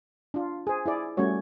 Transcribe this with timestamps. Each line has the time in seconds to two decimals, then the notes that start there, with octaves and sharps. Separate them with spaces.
0.34 D4 F4
0.67 G#4 C5
0.86 E4 G#4 D5
1.17 G3 A3 C#4 F#4 C#5